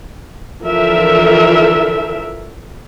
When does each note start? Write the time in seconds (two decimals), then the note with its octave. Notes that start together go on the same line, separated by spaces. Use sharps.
0.62 D3 E3 F3 A4 A#4 E5